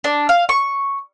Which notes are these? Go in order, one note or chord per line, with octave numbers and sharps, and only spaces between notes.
D4
F5
C#6